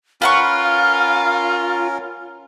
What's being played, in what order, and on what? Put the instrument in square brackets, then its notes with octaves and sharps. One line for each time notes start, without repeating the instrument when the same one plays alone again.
[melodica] C#4 A#4 [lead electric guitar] F4 [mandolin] B4 F#5 C#6 [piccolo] F6